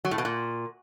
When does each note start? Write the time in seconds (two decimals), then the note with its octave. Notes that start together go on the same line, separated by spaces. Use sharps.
0.05 F#3
0.11 A2
0.18 B2
0.25 A#2